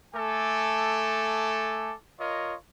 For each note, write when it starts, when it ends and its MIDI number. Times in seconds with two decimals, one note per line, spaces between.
0.15 1.94 57
0.15 1.94 69
0.15 1.94 80
0.15 1.94 86
2.19 2.54 65
2.19 2.54 70
2.19 2.54 73
2.19 2.54 75